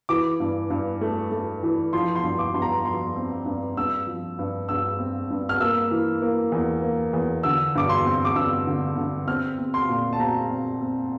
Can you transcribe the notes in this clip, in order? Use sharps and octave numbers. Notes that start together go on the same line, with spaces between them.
E3 D6
G2
G2
A3
A3
E3
F3 C6
C6
G2
D6
G2 C6
A#5
F3 C6
C4
G2
G2 E6
F3
G2
G2 E6
C4
G2
F6
A#3 E6
E3
A#3
E2
A#3
E2
D3 E6
G2 D6
C6
C4
D6
G2 E6
D3
D3
C4 F6
C4
C6
A#2
A5
C4 A#5
C4
C4